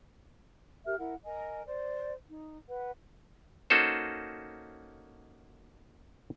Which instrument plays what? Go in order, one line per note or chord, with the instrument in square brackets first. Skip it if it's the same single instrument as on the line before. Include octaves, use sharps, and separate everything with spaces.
[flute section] G4 A#4 E5 F6
E4 A#4 F#5
A#4 D#5 G#5
C5 D5
D#4
B4 F#5
[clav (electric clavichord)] A#3 C#4 D#4 F#4 A4 C5